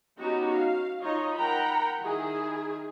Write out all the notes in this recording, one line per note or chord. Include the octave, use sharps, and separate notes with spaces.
B3 C#4 D#4 F#4 G4
F5
D#4 F4 C#5 D#5
A#4 F#5 G5 A#5 B5
D#3 E4 G#4